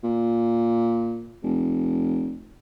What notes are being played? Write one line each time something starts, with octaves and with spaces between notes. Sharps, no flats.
A#2
F1